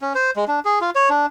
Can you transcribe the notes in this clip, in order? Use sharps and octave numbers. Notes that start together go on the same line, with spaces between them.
C#4
C5
G#3
D4
G#4
F4
C#5
D4